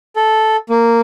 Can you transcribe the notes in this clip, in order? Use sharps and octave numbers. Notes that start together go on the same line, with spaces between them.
A4
A#3